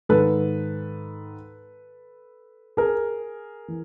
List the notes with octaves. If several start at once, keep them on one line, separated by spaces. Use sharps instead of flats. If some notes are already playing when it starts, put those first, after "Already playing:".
G#2 D#3 A4 B4
G#4 A#4
E3